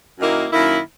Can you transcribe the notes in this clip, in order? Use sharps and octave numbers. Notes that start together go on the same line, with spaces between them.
F#2 D#3 A#3 E4
F#2 D#3 A#3 E4